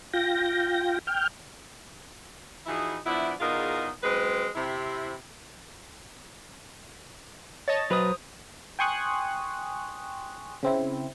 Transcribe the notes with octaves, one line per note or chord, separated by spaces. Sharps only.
F4 G5 A#6
G5 F6
E3 F3 D#4 E4 F#4 G#4
F3 B3 D4 E4
E2 B2 D#4 F4 G#4 A#4
F#2 G#3 C4 B4
C3 E4
C#5 D#5 A5 A6 A#6
F#3 B4 C5 D#6
G5 G#5 C6 C#6 D#6 F#6
C#3 C4 E4